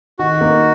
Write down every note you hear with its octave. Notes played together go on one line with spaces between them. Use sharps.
D#3 F#4
A#3 D#4